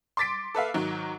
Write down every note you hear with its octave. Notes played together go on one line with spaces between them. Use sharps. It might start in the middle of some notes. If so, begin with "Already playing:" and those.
C6 D6 A6 B6 D7
A4 B4 E5 F5
G#2 D#3 F#3